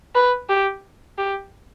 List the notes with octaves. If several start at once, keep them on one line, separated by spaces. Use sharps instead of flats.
B4
G4
G4